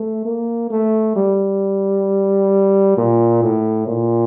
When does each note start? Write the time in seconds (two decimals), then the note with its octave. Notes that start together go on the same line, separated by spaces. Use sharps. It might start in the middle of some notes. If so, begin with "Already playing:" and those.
Already playing: A3
0.25 A#3
0.71 A3
1.16 G3
2.97 A#2
3.43 A2
3.87 A#2